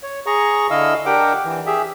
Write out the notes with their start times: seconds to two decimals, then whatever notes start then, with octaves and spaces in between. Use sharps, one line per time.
0.03 C#5
0.26 G#4 A#5 C#6
0.70 D3 E4 D#5 F5 E6
1.06 D4 G4 A#4 F#5 G5 D6
1.45 E3
1.66 G4 G#4 E5